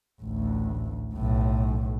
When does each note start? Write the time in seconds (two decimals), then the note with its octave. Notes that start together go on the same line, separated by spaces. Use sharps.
0.22 A1 D2
1.15 B1 A2